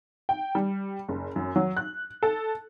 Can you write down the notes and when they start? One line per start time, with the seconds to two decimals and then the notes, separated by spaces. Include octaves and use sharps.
0.29 G5
0.55 G3
1.08 F#1
1.36 F#2
1.56 F#3
1.77 F#6
2.23 A4